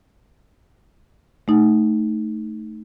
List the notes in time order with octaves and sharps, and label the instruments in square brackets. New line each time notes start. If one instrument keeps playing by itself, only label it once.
[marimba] A3 D#4